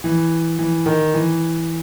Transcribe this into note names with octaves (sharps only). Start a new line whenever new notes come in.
E3
E3
D#3
E3